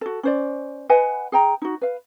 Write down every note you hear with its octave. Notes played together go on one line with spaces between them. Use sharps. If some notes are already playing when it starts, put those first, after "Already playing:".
F#4 A4
C#4 C5 D5
B4 D#5 F#5 G#5
G#4 G5 A#5
D#4 F#4
B4 F5